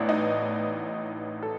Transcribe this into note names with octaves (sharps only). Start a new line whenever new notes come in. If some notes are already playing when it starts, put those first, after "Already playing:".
Already playing: A1 A2 E3 B3 D4
D#4
A4